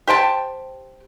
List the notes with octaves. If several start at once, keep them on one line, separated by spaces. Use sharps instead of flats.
G4 C5 G5 A5